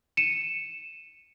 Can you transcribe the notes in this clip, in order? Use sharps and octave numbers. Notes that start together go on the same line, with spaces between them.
C#7 D#7 E7